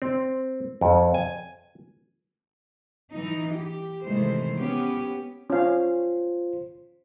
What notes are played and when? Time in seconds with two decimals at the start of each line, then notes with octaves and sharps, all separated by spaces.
0.02 C4
0.81 F2
1.14 G#5
3.13 E3 D#4
3.56 G4
4.05 C3 D#3 E3 G#3 A3 C5
4.55 B3 C#4 G4
5.50 C#4 F4 C5 F5